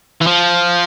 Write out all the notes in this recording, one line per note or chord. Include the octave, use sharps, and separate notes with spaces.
E3
F3